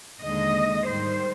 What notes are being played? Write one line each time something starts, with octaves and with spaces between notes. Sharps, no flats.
D#2 D3 G#3 D#5
G#2 D#3 G3 C5